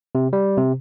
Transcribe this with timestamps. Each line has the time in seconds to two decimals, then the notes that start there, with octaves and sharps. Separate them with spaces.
0.15 C3
0.33 G3
0.58 C3